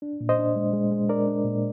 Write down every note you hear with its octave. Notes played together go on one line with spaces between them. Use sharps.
D4
A#2
C5 D#5
D4
G#3
G#3
G#3
D4 A#4 D5
D4
A#2